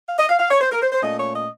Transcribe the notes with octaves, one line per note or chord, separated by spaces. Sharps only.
F5
D#5
F5
F5
C#5
C5
A#4
C5
C5
A#2 A3 C#4 D#5
C#5
D#5